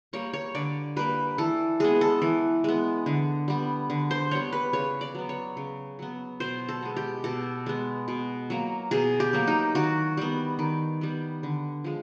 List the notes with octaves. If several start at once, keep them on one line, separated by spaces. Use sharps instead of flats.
G3 A#3 C#5
C#5
D3 D5
G3 A#3 B4
E3 A4
G#3 B3 G#4
A4
E3
G#3 B3
D3
G3 B3
D3
C5
G3 B3 C#5
B4
C#3 C#5
D5
F#3 B3
C#5
C#3
F#3 B3
B2 C5
A4
G#3 B3
G4
B2 A4
G#3 B3
B2
F#3 A#3
B2 G#4
G4
F#3 A#3
D#4
D#3 F#4
G3 B3
D#3
G3 B3
D3
F3 G#3